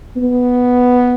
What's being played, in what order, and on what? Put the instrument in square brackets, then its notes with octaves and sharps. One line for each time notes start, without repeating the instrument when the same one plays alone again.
[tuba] B3